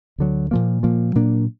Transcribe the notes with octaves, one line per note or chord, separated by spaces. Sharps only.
D2 D3 F#3
A#2 F3 A#3
A#2 F3 A#3
A#2 F#3 A#3 D4